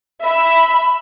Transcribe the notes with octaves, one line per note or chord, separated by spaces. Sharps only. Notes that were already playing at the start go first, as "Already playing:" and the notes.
E5 B5